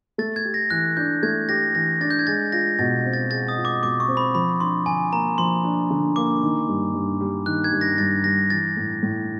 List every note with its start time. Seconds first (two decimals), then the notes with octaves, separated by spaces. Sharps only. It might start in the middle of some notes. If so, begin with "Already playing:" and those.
0.18 A3 A6
0.36 G#6
0.45 G4
0.54 A#6
0.70 E3 F#6
0.97 D4 G6
1.23 A3 G#6
1.49 G4 A#6
1.75 E3 A#6
2.01 D4 A6
2.11 G6
2.19 G#6
2.27 G#3 A6
2.52 F4 A#6
2.79 B2 A6
3.05 C4
3.13 A6
3.31 G#3 A6
3.48 D#6
3.57 F4
3.65 D6
3.83 B2 D6
4.00 C#6
4.08 C4
4.17 B5
4.35 F3 B5
4.60 D4 C6
4.86 D3 G#5
5.13 A#3 A#5
5.38 F3 C6
5.64 D4
5.91 D3
6.16 A#3 D6
6.43 D#3
6.68 G2
6.94 G2
7.21 G3
7.46 D#3 F#6
7.64 G#6
7.72 G2
7.81 A#6
7.98 G2 A6
8.24 G3 A#6
8.50 E3 A6
8.77 A2
9.03 A2